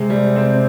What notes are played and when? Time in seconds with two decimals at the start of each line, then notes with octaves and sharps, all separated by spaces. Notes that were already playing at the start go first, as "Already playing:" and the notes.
Already playing: C3 G#3
0.10 G3
0.36 C4